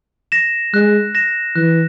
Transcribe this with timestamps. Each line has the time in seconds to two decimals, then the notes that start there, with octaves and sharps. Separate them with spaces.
0.32 A#6 E7
0.74 G#3 F#6
1.15 A#6 E7
1.56 E3 F#6